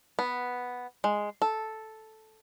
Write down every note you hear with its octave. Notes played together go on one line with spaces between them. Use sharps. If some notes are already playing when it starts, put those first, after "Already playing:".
B3
G#3
A4